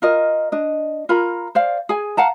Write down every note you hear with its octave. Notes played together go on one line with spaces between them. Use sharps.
F4 A#4 D#5
D4 D#5
F4 A#4 A#5 B5
C5 D5 F5
G#4 G#5
F5 F#5 A5 A#5